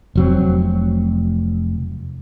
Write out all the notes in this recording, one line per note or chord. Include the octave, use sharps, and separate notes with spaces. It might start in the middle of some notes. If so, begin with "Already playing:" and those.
F1 F#3 C4